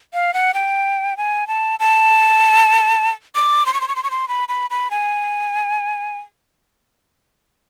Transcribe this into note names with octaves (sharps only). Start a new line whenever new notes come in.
F5
F#5
G5
G#5
A5
A5
D6
C6
C#6
C6
C#6
C6
C#6
C6
B5
B5
B5
G#5